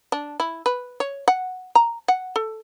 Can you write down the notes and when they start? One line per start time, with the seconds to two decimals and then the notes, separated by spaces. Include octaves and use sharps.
0.12 D4
0.40 E4
0.66 B4
1.00 C#5
1.28 F#5
1.75 A#5
2.08 F#5
2.36 A4